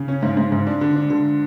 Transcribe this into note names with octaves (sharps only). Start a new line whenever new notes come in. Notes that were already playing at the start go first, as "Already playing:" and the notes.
Already playing: C#3
C#4
G#2
G#2
G#2
D4
D3
D4
D3